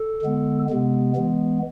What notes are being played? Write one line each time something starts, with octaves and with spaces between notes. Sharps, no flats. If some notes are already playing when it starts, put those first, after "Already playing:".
Already playing: A4
D3 G#3 B3
C3 G#3 B3
E3 G#3 B3